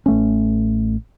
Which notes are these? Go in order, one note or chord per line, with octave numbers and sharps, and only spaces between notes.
A1 A3 C#4